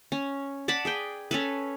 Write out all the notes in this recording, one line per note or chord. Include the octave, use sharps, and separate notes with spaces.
C#4
D5 F#5 A5 B5
G#4 B4 G5
C#4 A4 B4